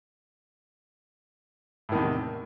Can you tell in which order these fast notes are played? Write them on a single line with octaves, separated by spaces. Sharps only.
A2 D#3 E2 C3